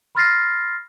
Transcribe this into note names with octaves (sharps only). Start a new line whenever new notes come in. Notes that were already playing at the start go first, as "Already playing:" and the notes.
B5 C6 F6 A6 A#6 C7